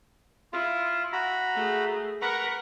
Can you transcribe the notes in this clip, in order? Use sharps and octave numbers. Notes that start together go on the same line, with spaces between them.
E4 F4
F#4 A#5 B5
A3 G#4
A#4 B4 F#5 A#5 C#6